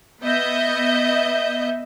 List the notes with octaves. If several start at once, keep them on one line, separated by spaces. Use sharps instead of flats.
B3 D#5 E5 G6